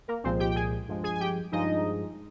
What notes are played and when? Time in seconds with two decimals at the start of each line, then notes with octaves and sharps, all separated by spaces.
0.08 A#3 A#4
0.24 C2 A#2 F3 G#3 C4 C5
0.40 G4 G5
0.51 G5
0.56 G#4 G#5
0.88 G2 F3 G#3
1.03 G#4 G#5
1.15 G#5
1.20 G4 G5
1.52 G2 F3 G#3 D#4 D#5